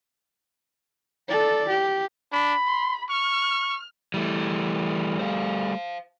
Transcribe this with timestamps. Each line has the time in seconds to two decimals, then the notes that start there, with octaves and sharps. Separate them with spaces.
1.28 A4 D5
1.68 G4
2.32 D4 B5
2.67 C6
3.10 C#6 F6
4.14 E3 G3 A3
5.19 C5 F5